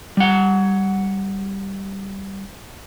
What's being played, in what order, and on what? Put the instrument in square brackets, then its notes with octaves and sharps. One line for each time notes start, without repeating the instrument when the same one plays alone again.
[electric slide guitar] G3 F#5